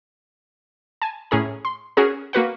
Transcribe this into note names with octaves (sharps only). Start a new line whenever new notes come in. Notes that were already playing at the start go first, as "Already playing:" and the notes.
G#5 A5
A2 C#4 G#4 A#5
C6
C#4 F#4 G#4 A#4
A#3 F#4 B4 F#5